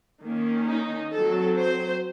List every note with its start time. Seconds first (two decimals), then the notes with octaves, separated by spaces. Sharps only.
0.22 D#3 A#3 C#4
0.68 D#4
1.13 F#3 C4 A4
1.58 C5